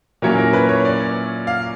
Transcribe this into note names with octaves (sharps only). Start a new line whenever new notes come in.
A#2 F#3 A#3 C#4 E4 A#4
A#4
B4
C#5
D5
F5